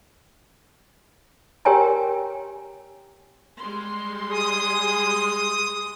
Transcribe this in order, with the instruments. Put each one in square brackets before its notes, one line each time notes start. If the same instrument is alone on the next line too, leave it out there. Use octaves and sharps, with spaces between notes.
[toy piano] G4 A#4 C#5 G5 G#5 A#5
[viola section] G3 G#3 C6
[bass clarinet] G#4 [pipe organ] D#6